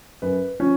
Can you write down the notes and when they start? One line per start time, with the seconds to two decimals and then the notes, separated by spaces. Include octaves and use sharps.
0.22 F#2 B4
0.60 F3 C#4